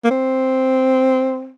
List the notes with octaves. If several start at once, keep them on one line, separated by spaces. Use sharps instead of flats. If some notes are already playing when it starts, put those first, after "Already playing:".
A#3
C4